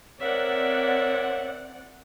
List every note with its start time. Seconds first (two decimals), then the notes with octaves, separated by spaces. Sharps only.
0.20 C4 A#4 C#5 D5 E5 F#5